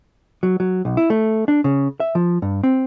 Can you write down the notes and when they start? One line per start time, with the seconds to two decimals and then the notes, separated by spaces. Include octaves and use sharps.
0.43 F#3
0.60 F#3
0.85 B1
0.97 E4
1.10 A3
1.48 D4
1.64 C#3
2.00 E5
2.15 F3
2.42 G2
2.63 C4